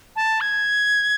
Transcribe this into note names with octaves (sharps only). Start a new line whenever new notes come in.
A5
G#6